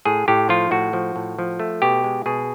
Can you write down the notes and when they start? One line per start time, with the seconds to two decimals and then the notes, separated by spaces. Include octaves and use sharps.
0.05 A2 G#4
0.28 A2 G4
0.49 F3 F4
0.71 A2 F#4
0.93 F3
1.16 A2
1.39 F3
1.59 A3
1.82 B2 G4
2.04 G#3
2.26 B2 G#4